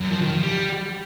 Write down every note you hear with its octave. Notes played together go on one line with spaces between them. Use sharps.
F#2
F3
D#3
F3
G3